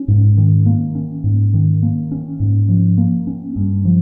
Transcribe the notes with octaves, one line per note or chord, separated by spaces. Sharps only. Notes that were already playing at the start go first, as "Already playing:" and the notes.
Already playing: C#4
G#2
D#3
A#3
C#4
G#2
D#3
A#3
C#4
G#2
F3
A#3
C#4
G2
F3